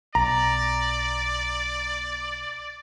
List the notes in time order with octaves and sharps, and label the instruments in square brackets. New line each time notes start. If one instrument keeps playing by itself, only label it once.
[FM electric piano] B1 [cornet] D5 [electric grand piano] A#5